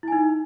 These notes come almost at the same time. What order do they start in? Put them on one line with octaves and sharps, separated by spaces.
E4 G#5 D#4